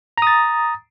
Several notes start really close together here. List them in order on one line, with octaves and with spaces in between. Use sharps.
A#5 D#6 A6